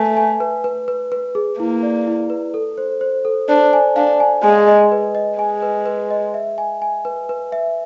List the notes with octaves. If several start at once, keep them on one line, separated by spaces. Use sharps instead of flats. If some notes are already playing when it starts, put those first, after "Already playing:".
Already playing: A3 B4 E5 G#5
G#5
B4
B4
B4
B4
G#4
A#3 E4
D5
E4
B4
A4
C5
C5
A4
D4 C5
G#5
D4 F5
G#5
G#3 G#5
D#5
B4
D#5
G#3 G#5
B4
B4
D#5
E5
G#5
G#5
B4
B4
E5